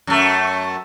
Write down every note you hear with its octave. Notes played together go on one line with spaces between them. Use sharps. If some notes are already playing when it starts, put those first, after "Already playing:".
F#2 A3